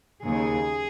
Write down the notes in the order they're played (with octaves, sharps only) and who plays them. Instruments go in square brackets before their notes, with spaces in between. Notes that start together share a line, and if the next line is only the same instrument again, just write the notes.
[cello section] D#2 C#3 G#4